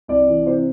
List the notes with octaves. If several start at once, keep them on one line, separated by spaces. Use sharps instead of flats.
C2 D5
E3
C3 C5